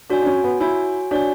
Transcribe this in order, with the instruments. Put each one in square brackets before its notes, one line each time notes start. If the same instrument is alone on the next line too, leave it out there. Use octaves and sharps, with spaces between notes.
[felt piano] D4 [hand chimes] F#4 C#5 G#5
[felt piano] D4
C#4
B3
[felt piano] E4 [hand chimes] F#4 C#5 G#5
[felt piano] D4 [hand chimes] F#4 C#5 G#5